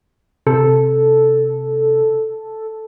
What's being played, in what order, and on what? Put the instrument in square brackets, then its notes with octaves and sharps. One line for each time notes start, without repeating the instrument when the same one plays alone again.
[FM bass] C3 [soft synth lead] A4